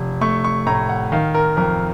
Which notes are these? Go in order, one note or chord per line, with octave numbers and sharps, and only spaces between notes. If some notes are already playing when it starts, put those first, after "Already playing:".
Already playing: F1
A3 C#6
C#6
A2 A#5
F#5
D#3 F5
A#4
F2 A#4